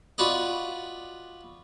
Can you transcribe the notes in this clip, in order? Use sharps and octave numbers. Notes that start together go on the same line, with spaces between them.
F4 F#4 B4 D5 D#5